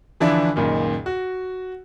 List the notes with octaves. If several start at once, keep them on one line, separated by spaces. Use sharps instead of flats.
D3 E3 F3 D4 E4
C#2 F#2 A#2 D#3
F#4